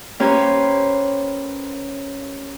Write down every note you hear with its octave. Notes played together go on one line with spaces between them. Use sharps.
A#3 C#4 G4 B4 C5